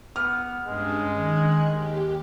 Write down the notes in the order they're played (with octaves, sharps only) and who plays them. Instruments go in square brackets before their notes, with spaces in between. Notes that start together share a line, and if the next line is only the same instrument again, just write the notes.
[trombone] B3 [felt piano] F6
[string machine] G2 C#4 D4 [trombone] G#3
[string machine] D#3 F#6 G#6
D#2 G4